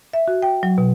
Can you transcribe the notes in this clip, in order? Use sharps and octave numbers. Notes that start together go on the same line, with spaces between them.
E5
F#4
G5
F#3
B2